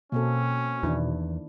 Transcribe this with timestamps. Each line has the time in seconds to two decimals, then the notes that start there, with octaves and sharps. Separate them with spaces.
0.12 B2 A#3 C4 C#4 A4
0.83 E2 D#3 D4 E4